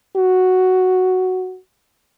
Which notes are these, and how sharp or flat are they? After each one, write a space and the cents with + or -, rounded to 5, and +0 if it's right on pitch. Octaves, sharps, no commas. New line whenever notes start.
F#4 +0